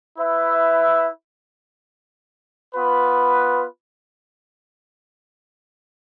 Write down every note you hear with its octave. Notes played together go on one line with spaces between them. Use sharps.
E4 B4 E5
B3 F4 B4